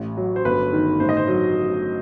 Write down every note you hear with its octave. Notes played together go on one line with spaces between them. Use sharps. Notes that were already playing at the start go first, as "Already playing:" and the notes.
Already playing: A1
F#3
C5
G1 B4
D#3
A1 C5
D#5
C5
F#3